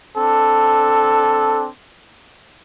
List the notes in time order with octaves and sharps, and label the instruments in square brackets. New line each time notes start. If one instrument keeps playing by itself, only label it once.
[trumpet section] C4 D4 A4